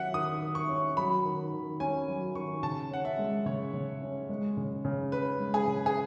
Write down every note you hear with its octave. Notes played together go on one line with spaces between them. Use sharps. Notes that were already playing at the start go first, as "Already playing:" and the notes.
Already playing: D#3 F#3 C#4 E5 F#5
D#3 D#6
D#3
C#6
C#4
F#3 B5
D#3
D#3
C#4 G#5
F#3
D#3 C#6
C#3 A5
C#4 F#5
E5
G#3
C#3 C#5
C#3
C#4
G#3
C#3
C#3
C#4 B4
G#3
G#4
C#3
G#4